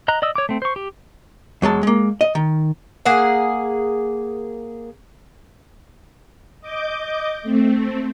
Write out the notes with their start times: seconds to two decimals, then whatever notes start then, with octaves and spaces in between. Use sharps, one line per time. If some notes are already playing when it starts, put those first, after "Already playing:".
0.08 D#5 A#5 F#6
0.22 D5 D#5 D#6 E6
0.36 C#5 D6
0.49 A3 C4
0.62 C5 C#6
0.76 G4
1.62 E2 F#3 G#3 A5
1.83 G#3 A#3
2.21 D#5
2.35 D#3
3.06 A#3 G#4 F#5
6.61 D#5 D6 G6
7.43 A3 C4